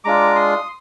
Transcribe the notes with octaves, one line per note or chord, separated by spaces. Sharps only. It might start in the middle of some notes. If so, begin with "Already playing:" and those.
G#3 D4 F4 A#5 D6
C6 D#6